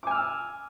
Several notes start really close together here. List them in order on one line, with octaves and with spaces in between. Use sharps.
D6 G#5 F6 E6